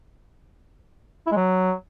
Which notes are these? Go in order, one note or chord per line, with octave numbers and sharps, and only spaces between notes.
E4
G#3
F#3